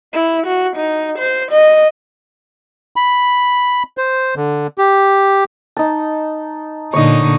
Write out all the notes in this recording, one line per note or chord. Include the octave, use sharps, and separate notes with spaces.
E4
F#4
D#4
C5
D#5
B5
C5
D3
G4
D#4 A5
A#2 D3 D#4 C#5 D#5